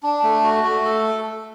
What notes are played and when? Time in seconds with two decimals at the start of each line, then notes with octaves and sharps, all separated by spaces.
0.03 D4
0.23 A3
0.44 F#4
0.64 A3
0.85 A4